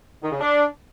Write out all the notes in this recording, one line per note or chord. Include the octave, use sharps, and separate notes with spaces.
D#3
C#3
D4